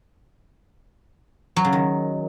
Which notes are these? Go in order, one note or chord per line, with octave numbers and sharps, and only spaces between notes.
F#3
C#3
D#3